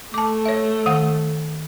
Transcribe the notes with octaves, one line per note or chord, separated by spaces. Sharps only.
A3 A5 D6
C#5 E5
D#3 F5 F#5